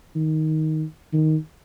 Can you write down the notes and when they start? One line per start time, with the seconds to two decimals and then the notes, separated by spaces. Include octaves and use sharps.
0.15 D#3
1.13 D#3